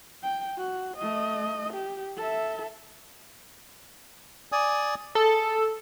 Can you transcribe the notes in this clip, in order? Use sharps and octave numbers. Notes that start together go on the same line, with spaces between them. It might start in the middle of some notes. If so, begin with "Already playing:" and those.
G5
F#4
A3 D#5
G4
A4 E5
D5 G#5 D#6
G#4 A4